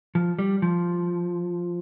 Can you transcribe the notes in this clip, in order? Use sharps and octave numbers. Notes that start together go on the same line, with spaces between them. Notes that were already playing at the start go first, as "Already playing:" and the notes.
F3
G3
F3